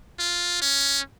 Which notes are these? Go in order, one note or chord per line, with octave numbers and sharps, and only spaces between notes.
F4
C#4